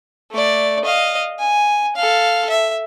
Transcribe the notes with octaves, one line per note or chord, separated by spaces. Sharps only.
A3 D5
D#5 F5
G#5
A4 F5
E5